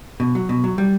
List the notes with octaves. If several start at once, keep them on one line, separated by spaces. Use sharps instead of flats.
B2
F#3
B2
F#3
G3